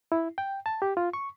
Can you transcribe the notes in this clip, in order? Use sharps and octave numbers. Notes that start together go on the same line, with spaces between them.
E4
G5
A5
G4
F4
C#6